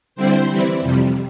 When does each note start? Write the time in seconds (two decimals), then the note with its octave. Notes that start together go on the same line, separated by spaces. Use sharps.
0.15 D3 G3 C4 E4 C5
0.48 E3 G3 C4 E4
0.81 F2 C3 G3